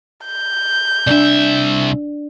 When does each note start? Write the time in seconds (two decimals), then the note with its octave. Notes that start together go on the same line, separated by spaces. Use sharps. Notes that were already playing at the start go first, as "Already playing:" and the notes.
0.25 G6
1.07 C2 D4 D5 E5